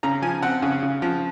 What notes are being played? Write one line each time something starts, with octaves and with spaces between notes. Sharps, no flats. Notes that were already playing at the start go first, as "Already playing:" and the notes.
C#3 A#5
F3 G#5
C4 F#5
C#3
C#3
F3